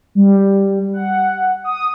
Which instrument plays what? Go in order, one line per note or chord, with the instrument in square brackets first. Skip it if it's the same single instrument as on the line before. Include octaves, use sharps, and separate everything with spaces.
[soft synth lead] G3
F#5
D#6